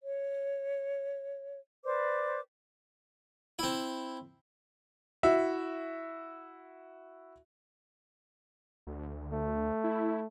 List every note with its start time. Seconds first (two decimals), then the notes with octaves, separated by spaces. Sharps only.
0.04 C#5
1.84 B4 C5 D5 D6
3.59 C4 E4
5.23 E4 F#4 E5
8.87 D2
9.33 A3
9.84 E4